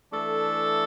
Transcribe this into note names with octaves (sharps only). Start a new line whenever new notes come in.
E3 A3 D4 A4